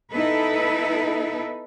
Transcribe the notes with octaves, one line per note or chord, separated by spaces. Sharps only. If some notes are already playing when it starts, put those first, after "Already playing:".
B3 D#4 E4 A4 B4